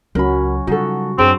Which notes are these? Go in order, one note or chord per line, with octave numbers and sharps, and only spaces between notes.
C#2 F#3 C#4 F#4 A#4 B5
C#3 G3 D#4 F4 F#4 A4
F#2 C4 D4 G#4 C#5